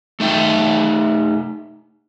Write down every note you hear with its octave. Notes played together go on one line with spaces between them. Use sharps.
A3 D#4 E5 G5